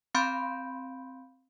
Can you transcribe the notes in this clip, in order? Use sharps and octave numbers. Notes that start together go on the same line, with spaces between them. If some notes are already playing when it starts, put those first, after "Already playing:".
C4 F5 B5 C6 G6 D7